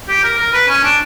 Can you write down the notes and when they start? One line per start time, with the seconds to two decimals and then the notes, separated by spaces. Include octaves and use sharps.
0.08 G4
0.24 A#4
0.38 A#4
0.53 B4
0.68 C#4
0.84 D4